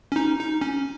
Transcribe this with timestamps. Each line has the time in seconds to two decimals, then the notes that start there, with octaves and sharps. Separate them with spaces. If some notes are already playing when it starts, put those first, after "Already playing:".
0.12 C#4
0.16 D#4
0.39 D#4
0.61 C#4